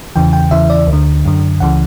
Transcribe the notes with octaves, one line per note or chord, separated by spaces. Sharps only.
E2 C#3 E3 G5
G5
E2 C#3 E3 E5
D5
D2
D3
F#2 D3
C#2 C#3 E3 F#5